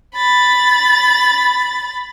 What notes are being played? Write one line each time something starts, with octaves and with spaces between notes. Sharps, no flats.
B5 A6